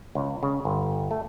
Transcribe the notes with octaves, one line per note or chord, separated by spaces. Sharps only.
C#2
C#3
G1
A3